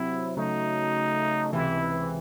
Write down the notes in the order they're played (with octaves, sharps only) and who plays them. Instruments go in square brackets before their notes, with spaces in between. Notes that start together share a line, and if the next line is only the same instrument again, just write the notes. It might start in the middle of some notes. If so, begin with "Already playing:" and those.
Already playing: [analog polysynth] C3 F#3 C4 [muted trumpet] E4
[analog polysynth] C#3 F#3 A3 [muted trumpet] D#4
[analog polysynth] C#2 C3 E3 [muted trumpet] E4